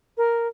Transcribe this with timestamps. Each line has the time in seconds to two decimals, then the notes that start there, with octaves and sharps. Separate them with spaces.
0.17 A#4